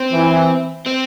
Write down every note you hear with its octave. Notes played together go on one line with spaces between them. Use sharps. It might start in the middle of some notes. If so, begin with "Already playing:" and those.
Already playing: C4
E3
C4